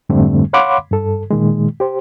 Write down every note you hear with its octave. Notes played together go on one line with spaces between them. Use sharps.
F2 G#2 D3 G3 A3 C4
C#5 F5 F#5 B5 C6 D6
G2 A4
A#2 D#3 G#3
G4 C5